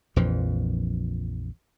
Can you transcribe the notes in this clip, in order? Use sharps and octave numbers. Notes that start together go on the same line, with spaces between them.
A#1 F2 E3 F3